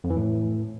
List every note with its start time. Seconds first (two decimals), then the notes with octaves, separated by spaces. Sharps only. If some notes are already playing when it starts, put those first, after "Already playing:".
0.04 F2
0.10 E3
0.16 A2